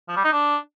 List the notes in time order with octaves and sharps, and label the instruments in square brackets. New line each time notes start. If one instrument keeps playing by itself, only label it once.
[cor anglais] F3
G3
D#4
D4